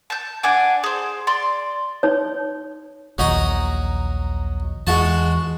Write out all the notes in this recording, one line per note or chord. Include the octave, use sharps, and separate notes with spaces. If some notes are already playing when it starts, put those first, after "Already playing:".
A5 G6
D4 F#5 G#5 D6
G#4 C5
D5 C6
D#4 C#5
A#1 D#2 F#3 D#4 A#5
E2 G#3 F#4 A5